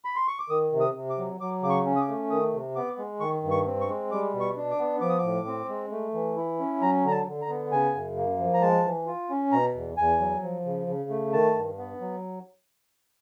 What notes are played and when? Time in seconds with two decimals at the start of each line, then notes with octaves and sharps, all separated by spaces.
0.05 B5
0.16 C6
0.27 C#6
0.39 D6
0.50 D#3 D#6
0.72 C3
0.80 D#6
0.95 C3
1.10 D6
1.18 F#3
1.41 F#3 D6
1.62 C#3 D6
1.70 C#6
1.86 C#4
1.96 D#6
2.01 D6
2.08 A3
2.30 D#3 D#6
2.53 C3
2.76 B3 D6
2.98 G#3
3.20 D#3 C#6
3.44 G2
3.51 C#6
3.66 C4
3.81 C#6
3.88 G#3
4.11 G3 D6
4.33 B2
4.41 C#6
4.57 D4
4.71 D6
4.79 B3
5.01 F3 D6
5.09 D#6
5.18 D6
5.23 A2
5.47 C4
5.69 G#3
5.91 A3
6.14 E3
6.37 E4
6.59 C#4
6.81 F#3 A#5
7.05 D3 A#5
7.11 A5
7.27 D3
7.42 A#5
7.49 B3
7.72 C#3 G#5
7.95 F#2
8.16 A#3
8.39 F3
8.54 A#5
8.61 G#3 A5
8.85 E3
9.07 F4
9.30 C#4
9.52 B2 A#5
9.75 E2
9.97 E2 G#5
10.20 F#3
10.43 F3
10.65 C#3
10.87 C#3
11.10 A3
11.32 D#3 A5
11.55 G2
11.78 B3
12.01 F#3